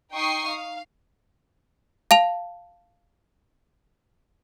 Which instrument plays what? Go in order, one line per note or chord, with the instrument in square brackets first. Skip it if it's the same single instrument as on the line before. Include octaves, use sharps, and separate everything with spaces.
[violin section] D#4 G5 C#6 D#6 C7
F5
[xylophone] F5 A5 F7